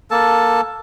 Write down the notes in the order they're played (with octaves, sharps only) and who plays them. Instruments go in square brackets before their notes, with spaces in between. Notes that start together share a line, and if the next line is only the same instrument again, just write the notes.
[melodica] A#3 A4 A5